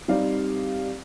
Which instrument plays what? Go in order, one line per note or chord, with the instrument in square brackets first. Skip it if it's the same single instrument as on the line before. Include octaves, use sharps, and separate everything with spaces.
[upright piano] G3 C4 D#4 C5 D5 F5